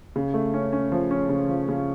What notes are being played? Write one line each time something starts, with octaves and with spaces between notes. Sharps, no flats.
C#3
A3
C#4
C#4
F3
C#4
C#3
F3
C#3